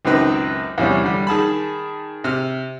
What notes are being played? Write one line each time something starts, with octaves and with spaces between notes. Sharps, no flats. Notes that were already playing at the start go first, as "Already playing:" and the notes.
C#2 F#2 D#3 C4 D#4 B4
E2 C3 E3 G3 C#4 D4
D3 G3
D#3 G#4 A5 B5
C3 F6